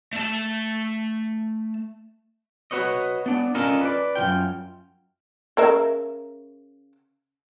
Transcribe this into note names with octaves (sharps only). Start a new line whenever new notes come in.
A3 A5
F#4 B4 C#5 D#5
B3 D4
C#4 D4 F4 A4 A#4 D#5
B4 D5
F#2 C#3 F4 G5
C#3 A#4 E5